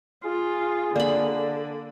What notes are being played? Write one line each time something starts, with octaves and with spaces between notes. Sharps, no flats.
F4 G#4
D3 A#3 D5 B5